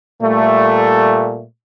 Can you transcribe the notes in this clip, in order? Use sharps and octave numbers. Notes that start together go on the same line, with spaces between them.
A#2 G3 A3